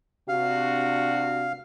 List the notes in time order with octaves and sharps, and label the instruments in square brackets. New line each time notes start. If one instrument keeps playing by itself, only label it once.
[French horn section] C3 D4 F#4 [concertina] F5